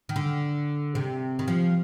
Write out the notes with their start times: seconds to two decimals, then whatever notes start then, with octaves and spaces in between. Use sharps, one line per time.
0.09 D#3
0.16 D3
0.95 C3
1.39 D#3
1.48 F3